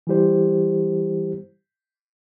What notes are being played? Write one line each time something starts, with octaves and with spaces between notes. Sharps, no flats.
E3 G3 E4 G4 C5